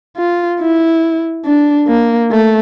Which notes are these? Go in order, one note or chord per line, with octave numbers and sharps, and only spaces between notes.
F4
E4
D4
A#3
A3